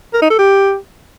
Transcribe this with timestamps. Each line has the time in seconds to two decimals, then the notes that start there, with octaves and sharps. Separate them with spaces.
0.13 A#4
0.22 D#4
0.30 A4
0.39 G4